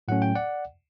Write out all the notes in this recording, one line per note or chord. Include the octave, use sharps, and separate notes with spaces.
A2 F#3 A3 C#4 F#5
G5
D5 F#5